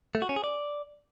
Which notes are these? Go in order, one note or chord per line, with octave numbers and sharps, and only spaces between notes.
A3
F#4
C#4
G#4
D5